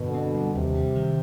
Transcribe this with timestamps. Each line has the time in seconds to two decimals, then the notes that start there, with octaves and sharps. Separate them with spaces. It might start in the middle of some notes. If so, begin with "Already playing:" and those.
Already playing: G2 B2 D3
0.14 C4
0.33 G3
0.54 D#2 C3
0.74 G3
0.95 D#3